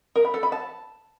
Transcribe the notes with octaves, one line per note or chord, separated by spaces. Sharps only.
A#4
B5
A4
B5
A5